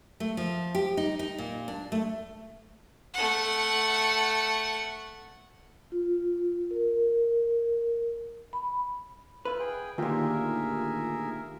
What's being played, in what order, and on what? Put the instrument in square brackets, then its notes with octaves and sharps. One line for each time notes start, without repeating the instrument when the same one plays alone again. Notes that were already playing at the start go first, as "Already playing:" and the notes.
[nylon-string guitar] A3
F3
G4
D#4
D#4
A#2
D4
A3
[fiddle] A3 F#5
[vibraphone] F4
A#4
B5
[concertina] E4 F4 [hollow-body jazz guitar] B4
[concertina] G#4 G5
[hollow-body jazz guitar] D2 A#2 [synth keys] D#3 F4 G4 [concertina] G#4 A#4 E5